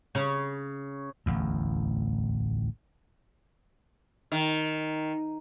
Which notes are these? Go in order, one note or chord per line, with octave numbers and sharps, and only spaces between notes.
C#3
D1 A1 E2
D#3